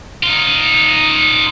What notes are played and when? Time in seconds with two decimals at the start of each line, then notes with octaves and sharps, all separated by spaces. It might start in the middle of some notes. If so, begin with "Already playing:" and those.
0.23 D#4 F4